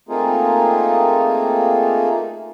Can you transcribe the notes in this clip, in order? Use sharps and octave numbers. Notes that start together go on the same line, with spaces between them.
A3 A#3 C4 D#4 F4 G#4